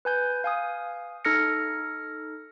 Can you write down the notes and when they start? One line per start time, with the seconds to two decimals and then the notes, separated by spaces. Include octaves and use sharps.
0.05 B4 G#5 G6
0.44 F5 G#5 D#6
1.25 D#4 A4 F6 A#6 C#7